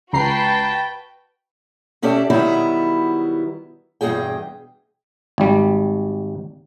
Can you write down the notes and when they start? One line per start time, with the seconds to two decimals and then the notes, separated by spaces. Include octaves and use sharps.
0.13 C#2 F#4 B4 G5 A5 A#5 C7
2.02 B2 C#4 G4 A4 D5 E5
2.30 B2 D#3 F#3 G3 B3 E4
4.01 E2 G2 B2 E3 G#4 G5
5.38 G#1 G3